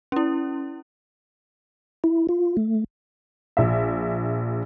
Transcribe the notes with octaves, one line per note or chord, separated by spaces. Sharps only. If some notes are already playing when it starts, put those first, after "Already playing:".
C#4 E4
E4
F4
A3
A#1 E5